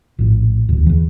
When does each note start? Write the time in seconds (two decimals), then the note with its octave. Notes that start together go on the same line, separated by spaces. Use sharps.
0.19 A#1 A2
0.69 E1 D2
0.87 E2 E3